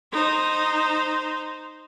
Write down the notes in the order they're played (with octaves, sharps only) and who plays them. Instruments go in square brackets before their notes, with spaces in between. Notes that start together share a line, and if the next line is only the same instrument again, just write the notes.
[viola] D#4 C5